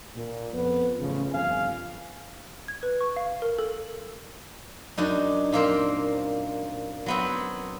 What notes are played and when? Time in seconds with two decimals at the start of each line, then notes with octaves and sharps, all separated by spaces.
0.15 A#2
0.52 F2 B3
1.00 A1 C#3 F3
1.32 G1 F2 F5 G#5
2.68 G#6
2.83 B4
3.01 C#6
3.16 F5
3.42 A#4
3.58 A4
4.98 F#2 D4 D#4
5.52 A#2 A#3 C4 A#4 C5
7.06 F#3 B3 C4